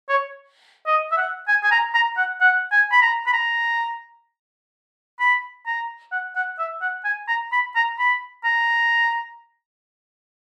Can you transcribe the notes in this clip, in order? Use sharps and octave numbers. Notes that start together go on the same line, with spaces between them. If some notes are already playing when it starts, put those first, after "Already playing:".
C#5
D#5
E5
F#5
G#5
G#5
A#5
A#5
F#5
F#5
G#5
B5
A#5
B5
A#5
B5
A#5
F#5
F#5
E5
F#5
G#5
A#5
B5
A#5
B5
A#5